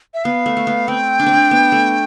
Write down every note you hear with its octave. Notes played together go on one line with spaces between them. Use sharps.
E5
B3 F5
A3
A3
B3
C4 G5
D4
C4
D4
B3
A3